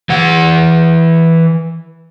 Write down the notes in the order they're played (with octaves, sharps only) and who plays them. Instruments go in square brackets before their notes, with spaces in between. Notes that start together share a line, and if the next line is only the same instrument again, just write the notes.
[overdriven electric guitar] E3 F#5